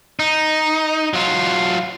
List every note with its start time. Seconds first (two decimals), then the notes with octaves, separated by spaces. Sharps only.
0.19 D#4
1.14 F#3 F4